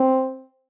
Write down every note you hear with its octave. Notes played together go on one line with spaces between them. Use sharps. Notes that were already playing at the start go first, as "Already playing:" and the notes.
Already playing: C4